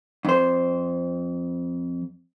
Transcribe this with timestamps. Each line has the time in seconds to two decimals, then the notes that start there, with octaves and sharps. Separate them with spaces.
0.25 F2 C5